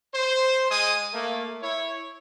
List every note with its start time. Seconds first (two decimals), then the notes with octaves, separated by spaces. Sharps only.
0.14 C5
0.71 G#3 G#5 D#6
1.14 A3 A#3
1.62 E4 C#5